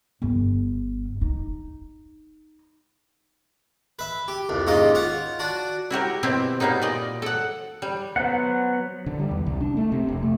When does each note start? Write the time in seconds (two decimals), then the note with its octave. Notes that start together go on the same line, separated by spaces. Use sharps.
0.22 G1
1.21 D#4
3.99 B4 E5
4.28 G4
4.49 C2 F2
4.67 D#2 G#2 C#4 F4 G4 D#5
4.95 F4 C#5 F#5
5.39 D4 F#4
5.91 E4 F#4 G4 A#4
6.23 B2 C4 E4 G4
6.60 B2 G3 A#3 B3 D#4
6.82 A#2 D5 D#5
7.22 A4 F#5
7.82 G3
8.16 F#3 B3 C5 F#5
9.06 D3
9.19 G3
9.31 E2
9.46 C2
9.61 D4
9.77 A3
9.92 C3
10.09 F1
10.23 A3